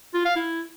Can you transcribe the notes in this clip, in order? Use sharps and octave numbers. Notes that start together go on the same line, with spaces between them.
F4
F5
E4